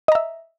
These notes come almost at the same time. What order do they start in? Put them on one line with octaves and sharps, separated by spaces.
D#5 A#5 E5